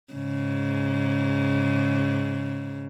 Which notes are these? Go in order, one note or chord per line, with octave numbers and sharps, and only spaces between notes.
G#2 C#3